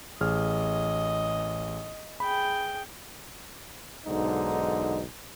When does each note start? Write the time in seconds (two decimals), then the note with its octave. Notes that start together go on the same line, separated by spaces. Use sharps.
0.21 A1 G#4 D#5 F6
2.20 G#4 G5 B5
4.06 B1 G#2 D3 D#4